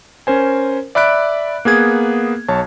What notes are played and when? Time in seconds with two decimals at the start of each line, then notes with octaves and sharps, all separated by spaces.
0.27 C#4 A#4 C5 G#5
0.95 D5 E5 B5 F#6 D7
1.65 A#3 B3 G#4 G#6
2.48 B1 C#5 A5